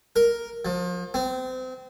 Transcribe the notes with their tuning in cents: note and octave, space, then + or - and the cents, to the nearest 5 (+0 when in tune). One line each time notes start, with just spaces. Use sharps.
A#4 +5
F3 +35
C4 -30